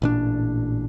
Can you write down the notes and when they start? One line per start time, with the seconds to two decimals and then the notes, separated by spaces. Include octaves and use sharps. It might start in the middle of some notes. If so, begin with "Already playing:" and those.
0.02 A1 A#2 D4